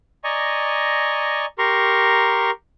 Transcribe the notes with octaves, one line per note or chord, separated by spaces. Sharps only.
D5 D#5 G#5 A#5 C#6
G4 A#4 A#5 C6 C#6